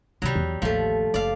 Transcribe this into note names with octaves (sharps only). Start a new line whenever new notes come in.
C3 D#3 F#3 G3
E2
A1 D#2 F3 A3
F#1 D5 F5